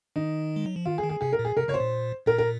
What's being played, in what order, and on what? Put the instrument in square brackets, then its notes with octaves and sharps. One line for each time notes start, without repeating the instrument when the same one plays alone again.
[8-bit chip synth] D#3 [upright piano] D#4
[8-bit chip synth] G#3
F#3
F3
[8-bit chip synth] D#3 [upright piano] F4
[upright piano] G#4
[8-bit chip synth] D#3
[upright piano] G#4
[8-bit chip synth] C3 [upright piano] G#4
[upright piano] A#4
[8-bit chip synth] A#2
[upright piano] G#4
[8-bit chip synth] C3 [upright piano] A#4
[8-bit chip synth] C#3 [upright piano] C#5
[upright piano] C5
[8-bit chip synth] A#2
[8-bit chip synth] A#2 [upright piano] A#4
[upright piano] A#4